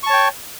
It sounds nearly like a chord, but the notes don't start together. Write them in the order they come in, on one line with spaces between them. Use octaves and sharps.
C#6 A5 C#5 G5